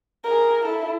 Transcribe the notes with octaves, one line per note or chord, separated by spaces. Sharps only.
G#4 A#4
E4 A4